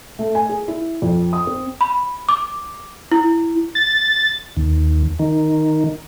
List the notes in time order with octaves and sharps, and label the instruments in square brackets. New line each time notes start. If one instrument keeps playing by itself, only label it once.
[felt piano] A3
G#5
G#4
E4
F2
D#6
C4
[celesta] B5
D6
E4
[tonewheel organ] A6
D#2
D#3